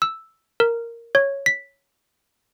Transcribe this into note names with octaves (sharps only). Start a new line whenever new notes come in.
E6
A#4
C#5
B6